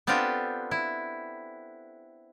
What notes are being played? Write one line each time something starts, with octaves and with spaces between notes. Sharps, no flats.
B3 C4 D4 F4 G4 A4
E4